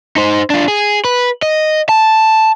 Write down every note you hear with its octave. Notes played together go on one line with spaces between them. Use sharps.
D#4 C5
D4 F4
G#4
B4
D#5
A5